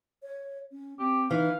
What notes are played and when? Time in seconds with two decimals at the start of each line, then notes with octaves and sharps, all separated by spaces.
0.23 C#5
0.72 C#4
0.99 C4 G4
1.31 E3 D#4 F5